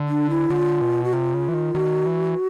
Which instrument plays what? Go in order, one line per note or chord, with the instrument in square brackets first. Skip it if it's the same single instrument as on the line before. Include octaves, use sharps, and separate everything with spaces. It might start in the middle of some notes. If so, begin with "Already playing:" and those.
Already playing: [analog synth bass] D3
[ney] D4
E4
[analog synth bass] D3 [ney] F4
[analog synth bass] B2
[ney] F#4
[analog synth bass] C3 [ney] F4
[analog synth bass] C#3
E3
D#3
[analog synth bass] D#3 [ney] F#4
[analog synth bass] E3